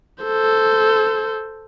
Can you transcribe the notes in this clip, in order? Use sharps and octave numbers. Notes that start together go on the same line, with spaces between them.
A4 C5